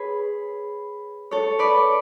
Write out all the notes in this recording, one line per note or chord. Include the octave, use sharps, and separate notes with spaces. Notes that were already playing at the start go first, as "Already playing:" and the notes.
Already playing: G#4 B4 C#5
A4 C#5
B4 D5